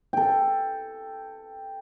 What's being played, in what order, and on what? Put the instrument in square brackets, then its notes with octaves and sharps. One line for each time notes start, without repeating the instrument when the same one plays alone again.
[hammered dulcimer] A4 G5